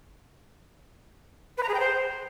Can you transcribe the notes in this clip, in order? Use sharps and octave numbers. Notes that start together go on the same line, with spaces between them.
B4
A#5
G#4
G5
C5